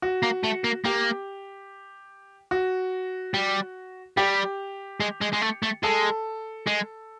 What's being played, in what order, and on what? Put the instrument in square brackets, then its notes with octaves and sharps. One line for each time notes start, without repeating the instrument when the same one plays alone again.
[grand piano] F#4
[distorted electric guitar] A#3
A3
A#3
[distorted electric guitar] A#3 [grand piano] G4
[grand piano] F#4
[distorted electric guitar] G3
[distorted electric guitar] G3 [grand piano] G4
[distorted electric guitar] G#3
G#3
G#3
A3
A3
[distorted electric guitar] G#3 [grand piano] A4
[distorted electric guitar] G#3